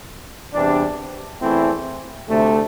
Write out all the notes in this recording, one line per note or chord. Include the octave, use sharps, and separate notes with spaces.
E2 C3 E3 G3 D4
E2 E3 A3 C4 E4
D2 C3 A3